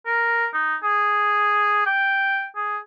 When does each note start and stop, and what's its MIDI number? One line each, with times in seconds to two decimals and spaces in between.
0.06 0.47 70
0.54 0.75 63
0.83 1.86 68
1.86 2.47 79
2.56 2.78 68